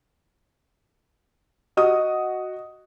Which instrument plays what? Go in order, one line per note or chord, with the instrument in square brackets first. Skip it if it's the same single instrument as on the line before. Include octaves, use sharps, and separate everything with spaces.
[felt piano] F#4 D#6 [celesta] D#5